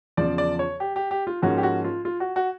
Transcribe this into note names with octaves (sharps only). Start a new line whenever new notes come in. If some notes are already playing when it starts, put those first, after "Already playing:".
E2 C#3 F3 D5
D5
C#5
G4
G4
G4
F4
G#2 F3 A#3 C#4 F#4
G4
F#4
F4
F4
F#4
F#4